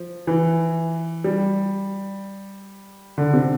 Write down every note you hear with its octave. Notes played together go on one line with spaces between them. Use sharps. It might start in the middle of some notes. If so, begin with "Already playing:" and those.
Already playing: F3
E3
G3
D3
C3